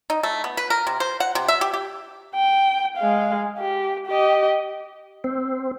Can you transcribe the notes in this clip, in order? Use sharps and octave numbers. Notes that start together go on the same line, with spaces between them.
D#4
A3
B3
B4
A#4
C3
C5
F#5
C3
E5
G4
G4
G5
G#3 F5
G4
G4 D#5
C4